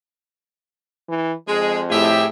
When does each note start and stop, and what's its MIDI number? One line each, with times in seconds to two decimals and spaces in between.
1.09 1.33 52
1.48 2.28 41
1.48 1.80 56
1.48 1.80 68
1.90 2.27 45
1.90 2.26 67
1.90 2.26 68
1.90 2.26 76